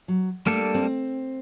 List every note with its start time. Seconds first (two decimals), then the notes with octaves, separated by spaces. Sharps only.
0.08 F#3
0.46 G3 A3 A#3 D4 A4
0.74 C4